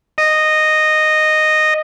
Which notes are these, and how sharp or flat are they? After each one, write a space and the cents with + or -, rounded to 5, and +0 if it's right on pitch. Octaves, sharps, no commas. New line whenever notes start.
D#5 -10